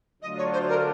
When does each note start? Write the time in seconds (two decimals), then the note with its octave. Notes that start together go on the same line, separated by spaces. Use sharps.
0.22 D3 F#3 A3 D4 F4 D#5
0.38 C#5
0.53 C5
0.69 A#4